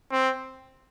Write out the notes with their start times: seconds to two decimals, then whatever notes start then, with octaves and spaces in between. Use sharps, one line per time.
0.11 C4